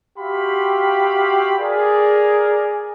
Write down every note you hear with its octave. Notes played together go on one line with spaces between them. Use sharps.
F#4 G4 E5 F5 B5 C6
G#4 A#4 D5